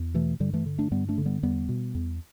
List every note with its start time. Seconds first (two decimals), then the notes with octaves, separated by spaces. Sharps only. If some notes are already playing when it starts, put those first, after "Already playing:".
Already playing: E2
0.14 B2 E3 A3
0.40 G2 D3 G3
0.53 E3 A3
0.66 D3
0.78 A3 D4
0.91 G2 G3 B3
1.09 A3 D4
1.18 D3
1.26 G3 B3
1.43 E2 G3 B3
1.69 B2
1.95 E2